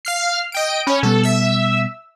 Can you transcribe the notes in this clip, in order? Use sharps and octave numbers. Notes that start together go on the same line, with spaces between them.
F5 F6 C7
D#5 G5 D7
C#4 C#5 B5
B2 G3 B3 A4
E5 E6